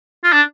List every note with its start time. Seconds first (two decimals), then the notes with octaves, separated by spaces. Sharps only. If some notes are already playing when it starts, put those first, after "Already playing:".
0.24 F4
0.32 D4